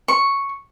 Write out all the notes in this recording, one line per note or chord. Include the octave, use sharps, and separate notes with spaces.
C#6